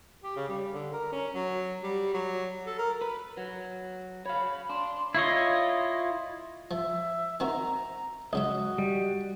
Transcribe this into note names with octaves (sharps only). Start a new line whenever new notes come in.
G4
C#3
G3
D3
A#4
C#4
F#3
G3
F#3
A4
A#4
B4
F#3
C#5 F5 B5
D4 C6
E4 F4 C#5 D#5
F3 E5
D#3 C4 F#4 A#5
C#2 F#3 F#4 D#5 E5
G3